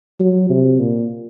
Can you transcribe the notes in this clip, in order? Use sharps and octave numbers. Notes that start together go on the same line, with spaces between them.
F#3
C3
A#2